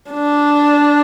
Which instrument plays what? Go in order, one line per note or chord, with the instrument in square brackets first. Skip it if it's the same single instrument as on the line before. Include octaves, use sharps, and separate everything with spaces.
[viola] D4